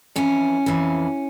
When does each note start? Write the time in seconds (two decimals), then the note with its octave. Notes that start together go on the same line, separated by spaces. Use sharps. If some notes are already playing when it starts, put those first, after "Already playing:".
0.16 F2 E3 C#4
0.66 F2 E3